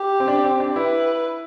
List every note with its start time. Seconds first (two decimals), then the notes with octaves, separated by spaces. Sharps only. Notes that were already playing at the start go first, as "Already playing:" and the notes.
Already playing: G4
0.20 C4
0.28 D4
0.44 C4
0.60 D4
0.76 E4 B4